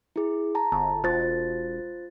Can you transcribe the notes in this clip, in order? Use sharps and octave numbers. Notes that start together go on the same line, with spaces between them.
E4 G#4
A5 A#5
G1 A5
E1 F4 C5 A6